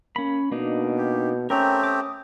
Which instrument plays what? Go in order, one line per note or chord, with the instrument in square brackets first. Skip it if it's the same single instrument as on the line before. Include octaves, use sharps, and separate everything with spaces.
[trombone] A#3 [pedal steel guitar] C#4 B5
[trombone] B2 [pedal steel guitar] A#3 D4 D#4
[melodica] G4
[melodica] A3 C4 G4 [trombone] C#4 [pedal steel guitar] A#4 G5 A#5
[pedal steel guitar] D6 D#6